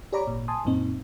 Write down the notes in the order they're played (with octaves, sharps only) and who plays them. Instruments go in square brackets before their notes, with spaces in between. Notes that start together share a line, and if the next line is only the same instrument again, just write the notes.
[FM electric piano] G4 C#5 D5 A#5 B5 D6
G#1 A#2
G#5 A5 C6 D#6
F#2 A#2 C4 D#4